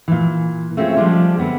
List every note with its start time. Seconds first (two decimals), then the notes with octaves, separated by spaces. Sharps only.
0.08 A#2 E3
0.77 A3 C4 C#4 F4 G4 G#4
0.96 F3 G3 G#3 D4 F4
1.37 D3 B3 C4